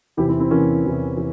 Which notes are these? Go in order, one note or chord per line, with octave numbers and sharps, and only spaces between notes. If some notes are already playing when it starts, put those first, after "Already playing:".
E2 C3 E3 E4 G4
C4 E4
C4 E4
E2 C3 E3 A#3 C#4
E2 C3 E3
E3